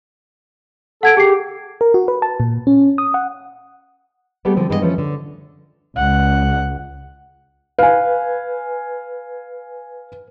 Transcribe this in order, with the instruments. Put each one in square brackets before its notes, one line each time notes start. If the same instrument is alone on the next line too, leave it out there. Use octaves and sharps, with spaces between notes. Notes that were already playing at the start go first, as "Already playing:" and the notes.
[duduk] A4 [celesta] F#5 G#6 D7
[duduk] G4 [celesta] G#4 C7
[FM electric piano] A#4
F#4
B4
A5
A#2
C#4
D#6
F#5
[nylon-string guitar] G3 A3 B3 G4 G#4
D3 F3 C4
G2 E3 G#3 B3 A4 D#5
E3 F3 A3 C#4
D3
[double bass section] C#2 [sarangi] F#5
[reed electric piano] B4 [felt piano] F5 G#5